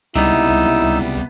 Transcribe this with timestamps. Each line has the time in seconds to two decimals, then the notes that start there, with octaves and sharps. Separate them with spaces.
0.15 C#2 C3 G3 B3 D#4 E4 E6